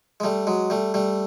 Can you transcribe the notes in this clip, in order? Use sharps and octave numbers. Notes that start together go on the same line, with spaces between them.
G#3
G3 A3
F#3 G#3
G3 A3
G3 A3